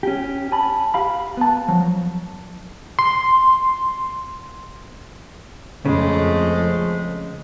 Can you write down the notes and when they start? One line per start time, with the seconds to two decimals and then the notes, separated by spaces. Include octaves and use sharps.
0.03 C#4 G4
0.52 G#5 A5 B5
0.94 G4 F5 B5
1.37 B3 A5
1.68 F3 F#3
2.99 C6
5.85 F2 C#3 G#3 A3